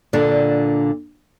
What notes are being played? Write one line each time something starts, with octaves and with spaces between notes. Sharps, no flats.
A#2 D3 D4